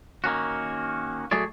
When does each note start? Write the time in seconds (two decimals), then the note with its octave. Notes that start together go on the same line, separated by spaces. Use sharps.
0.24 D#3 A#3 C#4 F#4
1.31 F#3 A3 G#4 C#5 D5